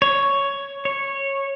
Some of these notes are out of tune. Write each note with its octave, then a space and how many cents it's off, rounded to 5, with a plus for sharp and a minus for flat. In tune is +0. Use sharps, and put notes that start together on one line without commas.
C#5 +5
C#5 -10